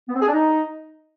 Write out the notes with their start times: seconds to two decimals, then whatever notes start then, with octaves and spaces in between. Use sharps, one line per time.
0.09 B3
0.15 C4
0.21 G#4
0.27 D4
0.34 D#4